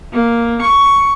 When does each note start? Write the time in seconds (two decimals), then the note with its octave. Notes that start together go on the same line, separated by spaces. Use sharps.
0.13 A#3
0.62 C#6